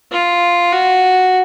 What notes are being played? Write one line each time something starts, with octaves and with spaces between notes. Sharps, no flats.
F4
F#4